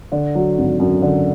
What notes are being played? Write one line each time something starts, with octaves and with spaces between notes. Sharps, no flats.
D3
F#3
G#1
F#2
D3